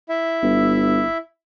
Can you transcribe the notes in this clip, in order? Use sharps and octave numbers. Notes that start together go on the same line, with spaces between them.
E4 E5
G1